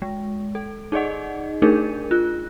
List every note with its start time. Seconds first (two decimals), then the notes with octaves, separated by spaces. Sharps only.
0.02 G#3
0.55 A4
0.92 D#4 G#4 D5 D#5 F#5
1.62 A3 D4 D#4 G#4 A#4
2.11 F4 F#6